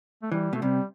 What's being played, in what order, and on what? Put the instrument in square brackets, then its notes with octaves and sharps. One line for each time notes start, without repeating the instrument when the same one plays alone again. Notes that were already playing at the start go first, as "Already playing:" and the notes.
[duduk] A3
[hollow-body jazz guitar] E3 [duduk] G3
[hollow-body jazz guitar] B2 [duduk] A3
[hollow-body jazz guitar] C3 [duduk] G3